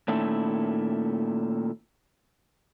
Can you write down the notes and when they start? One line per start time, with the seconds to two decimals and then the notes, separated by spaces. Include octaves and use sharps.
0.08 A#2 D#3 A3 C#4 E4